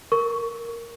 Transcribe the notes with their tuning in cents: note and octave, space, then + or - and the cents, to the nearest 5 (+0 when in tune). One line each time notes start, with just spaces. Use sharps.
A#4 +0 C#6 +15